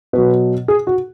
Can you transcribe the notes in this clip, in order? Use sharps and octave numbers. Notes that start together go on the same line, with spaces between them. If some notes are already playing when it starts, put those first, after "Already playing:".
B2 F#3 B4
G#4
F#4